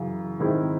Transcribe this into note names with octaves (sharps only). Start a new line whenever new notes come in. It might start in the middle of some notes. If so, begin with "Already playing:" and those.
Already playing: F#2 C#3 E3
G#2 D#3 G#3 C4 E4